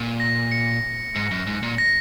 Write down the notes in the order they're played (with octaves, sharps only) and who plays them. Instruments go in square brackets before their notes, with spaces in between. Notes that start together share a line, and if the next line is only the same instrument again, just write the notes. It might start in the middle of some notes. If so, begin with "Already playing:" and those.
Already playing: [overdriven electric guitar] A#2
[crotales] A#6
C#7
[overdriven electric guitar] G#2 [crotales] C#7
[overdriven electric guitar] F#2
G#2
A#2
[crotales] A#6